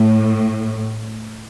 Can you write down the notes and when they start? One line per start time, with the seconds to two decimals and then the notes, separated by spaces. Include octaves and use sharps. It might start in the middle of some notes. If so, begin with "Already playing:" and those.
Already playing: A2